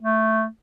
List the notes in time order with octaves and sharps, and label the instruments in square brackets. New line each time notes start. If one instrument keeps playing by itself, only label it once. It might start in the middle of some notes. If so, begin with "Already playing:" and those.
[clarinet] A3